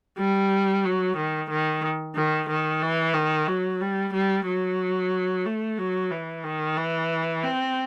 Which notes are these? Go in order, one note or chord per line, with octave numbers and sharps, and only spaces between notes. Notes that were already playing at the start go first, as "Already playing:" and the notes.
G3
F#3
D#3
D#3
D#3
D#3
E3
D#3
F#3
G3
G3
F#3
A3
F#3
E3
D#3
E3
C4